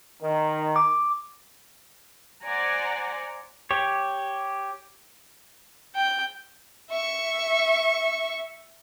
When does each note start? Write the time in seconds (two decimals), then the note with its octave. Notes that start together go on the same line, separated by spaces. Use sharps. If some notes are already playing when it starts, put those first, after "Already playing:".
0.22 D#3
0.76 D6
2.43 C5 D5 F#5 G#5 A#5
3.71 G4 C#5
5.95 G5
6.90 E5 C#6